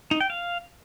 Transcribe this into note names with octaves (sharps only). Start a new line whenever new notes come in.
D#4
G5
F5